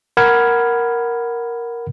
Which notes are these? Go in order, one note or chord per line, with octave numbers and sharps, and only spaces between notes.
A#4 F#5 B5 F6 G#6